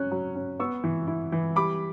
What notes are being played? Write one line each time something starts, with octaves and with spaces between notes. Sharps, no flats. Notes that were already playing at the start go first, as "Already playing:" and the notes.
Already playing: F#3 C#4 F#6
F#3
C#4
B3 C#6 E6
E3
E4
E3
G3 B5 D6